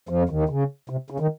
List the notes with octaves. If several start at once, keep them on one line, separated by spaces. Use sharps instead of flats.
F2 F3
D#2 D#3
C#3
C3
C#3
D#3